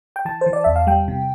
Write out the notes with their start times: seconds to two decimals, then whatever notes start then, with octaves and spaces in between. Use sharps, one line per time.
0.16 G5
0.25 E3 A5
0.41 C5
0.46 E3
0.53 D5
0.64 E2 E5
0.76 F5
0.87 G3 G5
1.08 C3